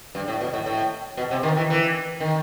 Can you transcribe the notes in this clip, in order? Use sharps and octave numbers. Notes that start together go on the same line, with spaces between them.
G2
A2
B2
A2
A2
B2
C3
D#3
E3
E3
D#3